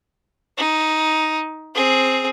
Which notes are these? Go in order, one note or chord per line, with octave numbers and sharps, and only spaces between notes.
D#4
C4 G#4